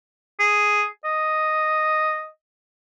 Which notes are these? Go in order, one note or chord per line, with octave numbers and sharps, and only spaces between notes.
G#4
D#5